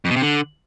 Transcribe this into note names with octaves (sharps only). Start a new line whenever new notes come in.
F2
B2
C3
D3